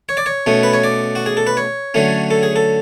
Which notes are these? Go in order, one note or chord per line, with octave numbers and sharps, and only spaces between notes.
C#5
D5
C#5
B2 A3 C#4
B4
C#5
D5
F#4
G#4
A4
B4
C#5
D3 F#3 A3 C#4
A4
G#4
A4